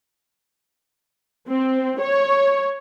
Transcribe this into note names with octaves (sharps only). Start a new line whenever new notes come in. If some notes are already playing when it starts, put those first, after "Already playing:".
C4
C#5